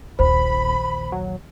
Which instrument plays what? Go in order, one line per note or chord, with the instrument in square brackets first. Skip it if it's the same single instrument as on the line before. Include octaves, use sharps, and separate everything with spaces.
[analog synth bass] D#1 [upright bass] A#1 D#2 [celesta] C5 [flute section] B5
[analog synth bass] F#3